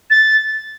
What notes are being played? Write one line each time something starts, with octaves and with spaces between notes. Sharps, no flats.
A6